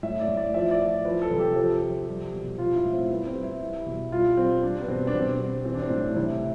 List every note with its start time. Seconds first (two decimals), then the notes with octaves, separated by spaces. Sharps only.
0.03 A2 E5
0.20 D5
0.29 A2
0.37 D5
0.54 F3 E5
0.71 D5
0.79 F3
1.05 F3 B4
1.22 A4
1.31 C3
1.39 G4
1.56 F3
1.82 F3
2.08 G3
2.34 B2
2.58 F3 F4
2.76 E4
2.84 A2
2.93 C4
3.09 G3 B3
3.27 C4
3.35 G3
3.43 E4
3.61 G3
3.87 B2
4.12 G3 F4
4.37 G3 C4
4.63 G3 D4
4.81 B3
4.88 B2 C4
5.07 D4
5.14 B2 C4
5.39 G3 C4
5.65 E3 C4
5.74 D4
5.82 C4
5.90 A2 D4
6.16 C3 E4